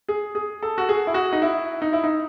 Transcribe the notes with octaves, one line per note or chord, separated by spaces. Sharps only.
G#4
G#4
A4
F#4
G#4
E4
F#4
D#4
E4
D#4
E4
D#4